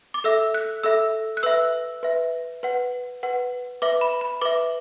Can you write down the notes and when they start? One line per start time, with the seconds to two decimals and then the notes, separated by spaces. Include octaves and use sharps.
0.14 D6
0.24 A4 E5 E6
0.54 F#6
0.83 A4 E5 E6
1.37 F#6
1.43 B4 E5 E6
2.03 B4 E5
2.63 B4 F#5
3.23 B4 F#5
3.82 B4 E5 D6
4.01 B5
4.21 B5
4.42 B4 E5 D6